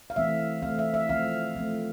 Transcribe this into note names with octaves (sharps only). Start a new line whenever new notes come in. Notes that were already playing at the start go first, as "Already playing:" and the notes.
F5
E3 A3 C4 E5
E3 A3 C4 F5
E5
E5
F3 A3 C4 F5
F3 A3 C4